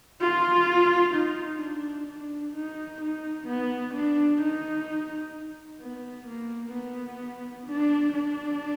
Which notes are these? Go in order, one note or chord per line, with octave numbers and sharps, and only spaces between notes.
F4
D#4
D4
D4
D#4
D#4
B3
D4
D#4
B3
A#3
B3
D4
D4